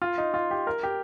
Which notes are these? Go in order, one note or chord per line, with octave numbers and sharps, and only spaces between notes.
F4
D#4
F4
G4
A#4
G4